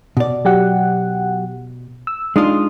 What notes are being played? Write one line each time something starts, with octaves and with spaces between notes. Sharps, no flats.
B2 D5
F#3 G4 F#5
E6
G#3 D4 D#4 F4 D#6